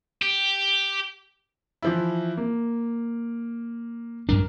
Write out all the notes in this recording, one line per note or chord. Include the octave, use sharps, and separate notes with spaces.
G4
E3 F3 E4
A#3
G2 F#3 D4 A#4